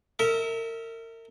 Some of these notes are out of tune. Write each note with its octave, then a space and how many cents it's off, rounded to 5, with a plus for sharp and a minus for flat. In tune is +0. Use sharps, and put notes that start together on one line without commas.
A#4 -35 E5 -25